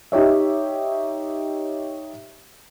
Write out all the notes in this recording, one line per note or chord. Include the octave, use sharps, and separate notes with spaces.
D#4 G4 C#5 E5